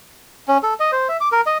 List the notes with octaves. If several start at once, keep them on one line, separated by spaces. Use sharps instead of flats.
C#4
A4
D#5
C5
E5
D6
A#4
D#5